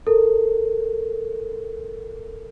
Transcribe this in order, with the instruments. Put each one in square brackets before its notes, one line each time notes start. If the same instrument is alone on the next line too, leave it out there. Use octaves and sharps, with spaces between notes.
[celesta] A4 A#4